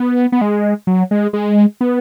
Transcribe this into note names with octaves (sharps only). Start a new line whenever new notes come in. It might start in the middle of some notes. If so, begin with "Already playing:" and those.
Already playing: B3
B3
G#3
F#3
G#3
G#3
B3